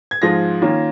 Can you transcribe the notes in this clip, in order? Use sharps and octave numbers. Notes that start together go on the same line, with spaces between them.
G#6
G#2 F3 G#3 F4 A#6
D#3 A#3 C#4 F4